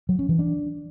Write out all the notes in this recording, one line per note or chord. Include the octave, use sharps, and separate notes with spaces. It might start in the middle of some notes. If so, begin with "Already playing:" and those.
F#3
C#4
E3
D4